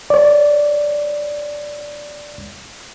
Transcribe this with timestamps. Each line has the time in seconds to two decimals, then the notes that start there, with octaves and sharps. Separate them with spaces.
0.10 C#5 D5